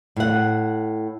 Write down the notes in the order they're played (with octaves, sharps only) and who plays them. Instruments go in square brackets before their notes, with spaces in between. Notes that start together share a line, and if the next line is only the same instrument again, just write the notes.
[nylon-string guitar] A2 F#5